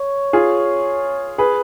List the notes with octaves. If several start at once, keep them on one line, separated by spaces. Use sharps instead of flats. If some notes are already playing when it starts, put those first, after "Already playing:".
Already playing: C#5
F4 G#4
G#4 B4